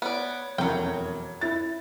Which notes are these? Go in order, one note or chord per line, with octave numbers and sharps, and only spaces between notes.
B3 C#5 D5
E1 F2 F#3 G5
E4 A6